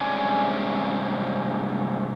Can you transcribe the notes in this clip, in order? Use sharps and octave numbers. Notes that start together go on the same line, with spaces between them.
G2 C3 G#3 C#4 D5 G#5